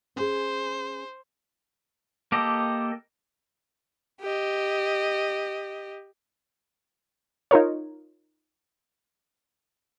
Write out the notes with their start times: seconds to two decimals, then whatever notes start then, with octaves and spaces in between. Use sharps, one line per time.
0.16 C#4 G#4 C5
2.32 A#3 G4 A4 D#5
4.21 G4 D#5
7.51 D#4 F4 A#4 C#5